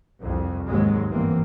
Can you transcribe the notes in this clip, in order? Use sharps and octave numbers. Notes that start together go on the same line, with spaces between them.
C2 F2
D#2 G#2 F#3 G#3
G1 E3 A#3 C4